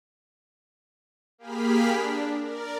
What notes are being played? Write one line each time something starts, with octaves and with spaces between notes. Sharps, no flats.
A#3 G4 G#4 B5 F6 B6
D4
A#4 D5